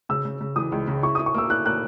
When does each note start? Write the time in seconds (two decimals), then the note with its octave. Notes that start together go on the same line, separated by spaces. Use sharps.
0.09 C#3 E6
0.25 C#3
0.41 C#3
0.56 E3 D#6
0.72 C#2
0.88 C#3
1.03 E4 C#6
1.15 E4 D#6
1.26 C#6
1.34 A#3 E6
1.50 E4 F#6
1.66 A#3 F#6